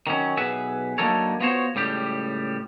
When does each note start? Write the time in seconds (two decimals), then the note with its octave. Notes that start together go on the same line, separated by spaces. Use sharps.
0.07 D#3 F#3 C#4
0.37 B1 G#4 B4 E5 F#5 B5
0.98 D3 F#3 A#3 D#4 A4 C#5
1.40 B3 F4 F#4 C5 C#5
1.75 C#2 A2 G3 G4